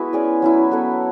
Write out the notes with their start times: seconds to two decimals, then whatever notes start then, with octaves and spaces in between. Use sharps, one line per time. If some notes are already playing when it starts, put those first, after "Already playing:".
Already playing: G#3 B3 E4 F#4 B4
0.13 C#4 G#4 D5
0.42 F#3 C#4 E4
0.71 B3 F#4 A4 C#5